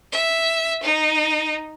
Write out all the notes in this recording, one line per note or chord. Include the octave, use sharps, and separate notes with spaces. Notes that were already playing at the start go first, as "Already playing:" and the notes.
E5
D#4